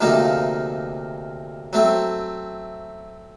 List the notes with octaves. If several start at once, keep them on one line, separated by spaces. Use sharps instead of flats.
D2 C3 F3 A#3 D#4
F#3 A3 C4